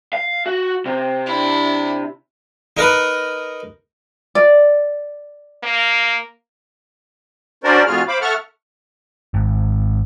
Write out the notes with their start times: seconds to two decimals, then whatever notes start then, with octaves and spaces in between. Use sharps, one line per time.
0.13 F5
0.46 F#4
0.86 C3
1.26 D4 E4
2.77 D#4 A#4 B4
4.35 D5
5.63 A#3
7.64 C#4 D4 F#4 A#4 C5 D5
7.87 F2 A2 F4 F#4 G#4 F6
8.08 C5 F5 B5 D6
8.21 A4 E5 F#5 C#6 F6
9.34 G#1